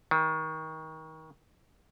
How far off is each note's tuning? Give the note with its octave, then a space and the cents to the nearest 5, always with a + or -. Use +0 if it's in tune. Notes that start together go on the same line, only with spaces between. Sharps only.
D#3 +30